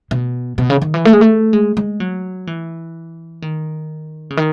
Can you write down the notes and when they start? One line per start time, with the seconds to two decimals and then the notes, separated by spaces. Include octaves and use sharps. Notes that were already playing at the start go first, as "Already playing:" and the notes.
0.11 B2
0.58 B2
0.70 C#3
0.82 D#3
0.94 E3
1.05 A3
1.13 G#3
1.21 A3
1.53 G#3
1.77 G#3
2.00 F#3
2.47 E3
3.42 D#3
4.30 C#3
4.37 D#3